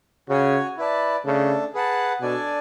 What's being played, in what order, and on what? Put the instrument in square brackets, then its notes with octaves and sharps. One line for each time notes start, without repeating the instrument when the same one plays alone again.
[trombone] C#3 [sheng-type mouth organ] F#4 C#5 G#5
[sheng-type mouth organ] E4 B4 D5 A5
[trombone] C#3 [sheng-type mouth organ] A3 D4 A4
[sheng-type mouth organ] G#4 B4 F#5 A5
[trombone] B2 [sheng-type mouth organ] D4 A4 D5 G#5